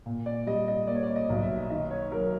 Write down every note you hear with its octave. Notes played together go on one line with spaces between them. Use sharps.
A#2
D5
G3 D#5
D#5
A#3 D5
C#5
D5
D#5
B1
E5
D#3 D#5
C#5
F#3 A#4